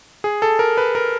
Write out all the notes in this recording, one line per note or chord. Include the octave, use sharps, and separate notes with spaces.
G#4
A4
A#4
B4
A#4